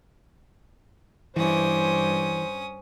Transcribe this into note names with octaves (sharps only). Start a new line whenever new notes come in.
G2 E3 C#4 C5 D#6